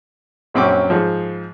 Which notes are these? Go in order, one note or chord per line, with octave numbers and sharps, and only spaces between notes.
A#1 F#2 C4 C#4 D6
G#2 F3